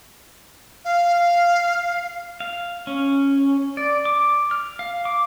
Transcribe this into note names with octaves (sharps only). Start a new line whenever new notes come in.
F5
F5
C#4
D5
D6
F6
F5
D6